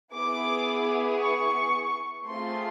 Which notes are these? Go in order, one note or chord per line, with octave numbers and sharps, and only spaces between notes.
B3 E4 G#4 D6
C#6
A3 C4 F4 G#4 C6